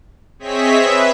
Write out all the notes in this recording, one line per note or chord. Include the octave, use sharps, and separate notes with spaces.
C4 G#4 C#5 D#5 E5 B6
B4 E5